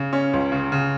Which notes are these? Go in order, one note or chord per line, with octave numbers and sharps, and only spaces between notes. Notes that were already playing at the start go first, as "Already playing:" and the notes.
Already playing: C#3
C#4
C#2
C#3
C#3